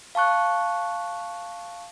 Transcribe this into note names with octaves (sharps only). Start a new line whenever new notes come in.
F5 A5 C#6 F#6